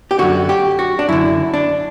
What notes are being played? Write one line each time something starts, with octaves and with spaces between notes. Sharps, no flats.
G4
F#2 D3 F#4
G4
F#4
D4
F#2 D3 E4
D4